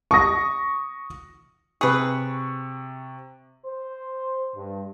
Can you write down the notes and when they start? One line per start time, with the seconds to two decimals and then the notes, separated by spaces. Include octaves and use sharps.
0.11 C#6 D#6 A#6
1.81 C3 G#4 B4 C#6
3.65 C5
4.55 G2